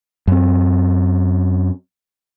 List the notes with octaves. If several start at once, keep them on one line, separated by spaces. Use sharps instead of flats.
F#2 C4